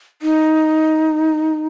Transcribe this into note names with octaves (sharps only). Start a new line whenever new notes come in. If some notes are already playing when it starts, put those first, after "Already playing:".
D#4